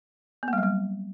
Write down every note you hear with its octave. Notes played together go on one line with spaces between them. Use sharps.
B3
A#3
G3
F#3
G3